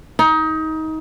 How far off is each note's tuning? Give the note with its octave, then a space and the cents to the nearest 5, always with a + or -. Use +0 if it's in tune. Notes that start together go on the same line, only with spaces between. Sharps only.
D#4 +25